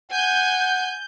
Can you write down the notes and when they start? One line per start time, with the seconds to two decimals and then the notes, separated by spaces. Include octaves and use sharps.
0.12 F#5 G#5 G6